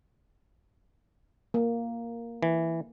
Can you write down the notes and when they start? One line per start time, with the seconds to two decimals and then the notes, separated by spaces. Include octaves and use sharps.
1.54 A#3
2.43 E3